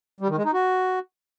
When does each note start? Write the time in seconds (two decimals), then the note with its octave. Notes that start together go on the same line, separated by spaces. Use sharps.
0.20 G3
0.29 D#3
0.37 G#3
0.45 D#4
0.54 F#4